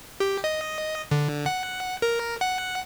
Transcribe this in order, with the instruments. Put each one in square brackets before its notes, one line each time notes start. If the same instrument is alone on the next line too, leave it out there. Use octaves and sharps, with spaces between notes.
[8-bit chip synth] G4
D#5
D3
F#5
A#4
F#5